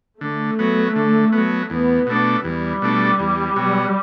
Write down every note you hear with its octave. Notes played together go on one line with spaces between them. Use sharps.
D3 A3
F#3 B3
D3
F#3 B3
E2 B3
B2 A3 D4
E2 G3
B2 A3 D4
E2
B2 F#3